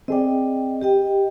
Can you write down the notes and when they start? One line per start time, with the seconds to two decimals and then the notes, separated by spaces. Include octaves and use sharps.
0.08 C4 G#4 D5 D#5 G5
0.81 G4 D#5 G5